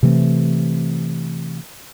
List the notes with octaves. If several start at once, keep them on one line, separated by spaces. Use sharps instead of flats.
C3 E3 A3 C4